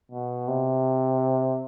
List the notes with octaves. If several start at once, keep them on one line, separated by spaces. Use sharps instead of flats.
B2
C3